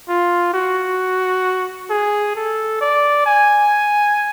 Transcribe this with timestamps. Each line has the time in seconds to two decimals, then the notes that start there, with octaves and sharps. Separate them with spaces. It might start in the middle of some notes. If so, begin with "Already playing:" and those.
0.09 F4
0.54 F#4
1.90 G#4
2.36 A4
2.81 D5
3.26 G#5